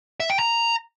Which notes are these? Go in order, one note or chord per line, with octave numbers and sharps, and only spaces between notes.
E5
G5
A#5